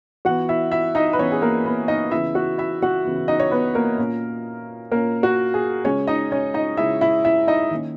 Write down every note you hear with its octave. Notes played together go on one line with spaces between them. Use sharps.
E3 B3 F#4 F#5
E4 E5
E4 E5
D#4 D#5
B4
E3 B3 C#4 C#5
G#4
A#3 A#4
B3 B4
D#4 D#5
C#3 E3 B3 E4 E5
F#4 F#5
E4 E5
F#4 F#5
C#3 E3 B3
D#4 D#5
C#5
B3 B4
A#3 A#4
A#2 A#3 C#4
A#2 A#3 C#4 A#4
F#4
G#4
C#3 G#3 C#4 C#5
D#4 D#5
C#4 C#5
D#4 D#5
C#3 G#3 C#4 E4 E5
E4 E5
E4 E5
D#4 D#5
D#3 A#3 C#4